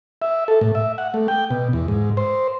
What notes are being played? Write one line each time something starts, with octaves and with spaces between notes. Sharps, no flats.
E5
A4
A2
E5
F#5
A3
G5
B2
E2
G#2
C5